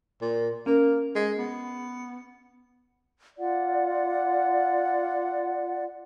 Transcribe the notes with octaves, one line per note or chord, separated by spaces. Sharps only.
A#2
A#3 C#4 A#4
G#3
B3
F4 D5 F#5